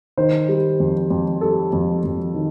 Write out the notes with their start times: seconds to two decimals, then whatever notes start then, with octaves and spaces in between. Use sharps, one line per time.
0.17 D#3 C5
0.49 G3
0.80 F2
1.10 F2
1.41 G3 A4
1.73 F2
2.04 F2
2.34 D#3